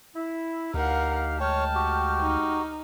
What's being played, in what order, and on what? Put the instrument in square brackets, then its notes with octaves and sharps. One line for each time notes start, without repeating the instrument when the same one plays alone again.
[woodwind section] E4
[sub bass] D2 [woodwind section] D#4 G4 F5 [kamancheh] A#4 F#5
[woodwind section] G#3 G5 F6 [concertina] C#5 [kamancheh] A5
[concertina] F#4 G4
[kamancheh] D#4